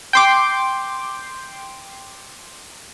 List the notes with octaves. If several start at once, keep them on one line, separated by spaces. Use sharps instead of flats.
G5 C6 D6